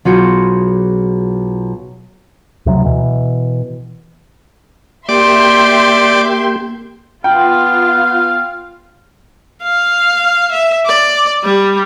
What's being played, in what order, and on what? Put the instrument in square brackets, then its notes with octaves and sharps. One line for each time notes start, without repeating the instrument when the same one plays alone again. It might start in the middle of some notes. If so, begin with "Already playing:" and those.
[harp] B1 F4 F#4 G#4 G6 C#7
[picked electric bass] D2 C3 F#3
B2 E3
[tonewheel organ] A#3 G4 G5 [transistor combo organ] D5 [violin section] E5 C6
[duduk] B3 [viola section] F4 [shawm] F5 [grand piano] G5
[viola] F5
E5
D5
G3